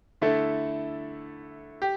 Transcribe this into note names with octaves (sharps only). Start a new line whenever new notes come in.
D3 A3 E4 A4
G4